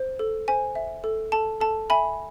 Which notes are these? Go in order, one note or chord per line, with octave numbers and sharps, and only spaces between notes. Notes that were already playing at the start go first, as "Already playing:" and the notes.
Already playing: C5
A4
C5 G#5
E5
A4
A4 A5
A4 A5
E5 G#5 B5